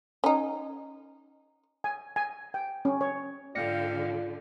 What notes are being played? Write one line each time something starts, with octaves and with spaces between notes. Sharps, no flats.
C#4 D#4
G#5
G#5
G5
C#4
C#5
G#2 D3 F4 D5 F5 G5 A#6 C#7